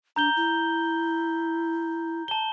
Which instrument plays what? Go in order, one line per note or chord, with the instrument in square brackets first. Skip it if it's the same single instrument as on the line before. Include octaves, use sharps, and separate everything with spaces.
[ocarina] D4 [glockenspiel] A#5 G6 G7
[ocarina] E4
[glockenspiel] A5 G7